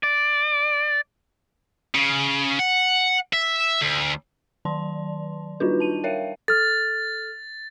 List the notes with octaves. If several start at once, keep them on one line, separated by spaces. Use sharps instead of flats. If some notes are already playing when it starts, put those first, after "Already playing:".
D5
C#3
F#5
E5
D2
D#3 F#3 D5 A5 C6
G3 D4 D#4 F4 F#4 B4
A5 D#7
A#4 C#5 E5 F5 G5
A4 F6 A6